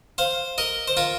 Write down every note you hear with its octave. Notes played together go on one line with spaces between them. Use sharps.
C5 F5
A#4 D#5
C5
F4 A#4